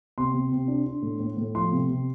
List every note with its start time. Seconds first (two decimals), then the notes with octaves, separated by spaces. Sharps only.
0.18 C3 C6
0.34 C3
0.52 C3
0.68 D4
0.86 D4
1.02 A2
1.19 A2
1.37 A2
1.54 F3 C6
1.72 C3
1.89 C3